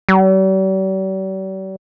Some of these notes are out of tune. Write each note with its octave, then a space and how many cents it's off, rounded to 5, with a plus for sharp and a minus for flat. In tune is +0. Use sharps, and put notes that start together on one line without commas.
G3 -45